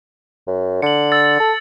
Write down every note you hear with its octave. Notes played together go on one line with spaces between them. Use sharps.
F#2
D3 C#7 F#7
E6 A6
A4